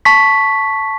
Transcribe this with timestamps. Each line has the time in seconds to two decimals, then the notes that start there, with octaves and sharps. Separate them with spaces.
0.05 A5 C#6 B6